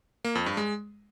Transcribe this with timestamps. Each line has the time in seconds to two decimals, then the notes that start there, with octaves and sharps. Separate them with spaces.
0.25 A#3
0.35 F2
0.46 G2
0.57 G#3